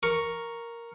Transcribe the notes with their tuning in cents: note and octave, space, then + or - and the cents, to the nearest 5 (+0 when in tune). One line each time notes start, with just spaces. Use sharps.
A#4 +0 C#6 +0